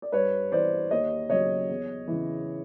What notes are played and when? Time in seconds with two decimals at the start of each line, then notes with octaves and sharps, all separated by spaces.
0.02 D5
0.12 G2 B4 C#5
0.52 E3 C5 D5
0.91 D#2 C#5 D#5
1.29 C#3 F#3 C#5 D#5
1.69 E2
2.08 C#3 E3